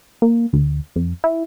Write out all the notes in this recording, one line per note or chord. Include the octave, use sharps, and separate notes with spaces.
A#3
D2
F2
E4